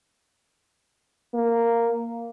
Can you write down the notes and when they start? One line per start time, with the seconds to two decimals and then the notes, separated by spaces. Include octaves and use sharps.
1.34 A#3